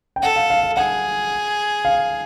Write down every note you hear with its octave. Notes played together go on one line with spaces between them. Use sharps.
G5
A4 F#5
F5
F5
F5
G#4 F#5
F5